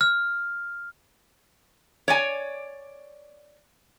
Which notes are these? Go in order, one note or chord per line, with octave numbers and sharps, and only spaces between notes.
F6
C#5 D5 G#5